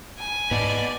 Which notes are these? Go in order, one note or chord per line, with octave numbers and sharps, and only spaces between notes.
G#5
G#2 B3 B4 D5 D#5 A5